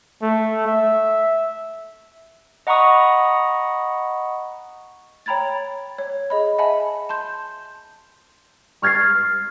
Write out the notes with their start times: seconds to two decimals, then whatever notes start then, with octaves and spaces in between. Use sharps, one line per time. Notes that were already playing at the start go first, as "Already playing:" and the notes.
0.22 A3
0.67 E5
2.67 D#5 F#5 A#5 B5 C#6 D#6
5.26 C#5 G5 A#5 B5 G#6 A6
5.98 C#5
6.30 G#4 D#5 B5
6.58 D#5 E5 F#5 G#5 A5 B5
7.09 A5 C6 G6
8.82 C#6 F6 G#6 A6 C7